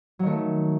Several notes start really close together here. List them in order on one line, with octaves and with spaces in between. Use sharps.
F#3 D#3 A3